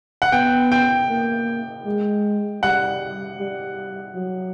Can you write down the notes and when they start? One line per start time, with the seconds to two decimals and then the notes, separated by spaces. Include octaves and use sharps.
0.22 F#5
0.32 B3 G5
0.72 G5
1.10 A#3
1.85 G#3
2.63 G3 F#5
3.39 G3
4.16 F#3